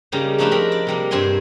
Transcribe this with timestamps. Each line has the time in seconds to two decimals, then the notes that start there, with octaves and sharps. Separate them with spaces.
0.12 C#3 G3 A#3 D#4
0.38 F3 A3 D4 D#4 B4 E5
0.51 C4 A#4 B5
0.72 D5
0.87 C3 G3 A#3
1.11 G2 C4 C5 G#5 C6